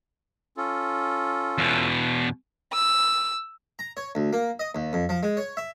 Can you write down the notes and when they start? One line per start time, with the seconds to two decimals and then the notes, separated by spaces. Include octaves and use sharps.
0.57 C#4 F4 A4
1.58 E2 B2
2.73 E6
3.79 A#5
3.97 C#5
4.15 D2
4.33 A#3
4.59 D#5
4.75 D#2
4.93 F2
5.09 F3
5.23 G#3
5.37 C#5
5.57 E5